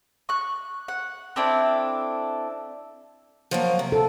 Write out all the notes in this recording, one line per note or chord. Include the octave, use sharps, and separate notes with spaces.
C#6 F#6
F#5
C4 D4 E4 A4
F3 F#3 A#3
C3
A4